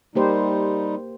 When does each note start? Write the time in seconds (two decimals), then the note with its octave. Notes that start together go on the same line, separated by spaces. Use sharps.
0.15 G3 A#3 D#4 G4 C5